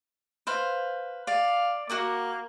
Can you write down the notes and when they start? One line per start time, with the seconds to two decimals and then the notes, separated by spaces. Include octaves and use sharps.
0.47 B4 C5 F5
1.27 D5 F5
1.90 A#3 F#4 F#5 D6